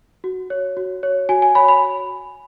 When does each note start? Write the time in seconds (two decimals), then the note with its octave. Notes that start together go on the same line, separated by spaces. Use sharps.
0.24 F#4
0.50 C#5
0.77 F#4
1.03 C#5
1.29 F#4 G#5
1.42 G#5
1.55 C#5 B5
1.68 B5